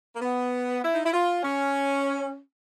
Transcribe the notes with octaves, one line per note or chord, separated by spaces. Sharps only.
A#3
B3
E4
D#4
E4
F4
C#4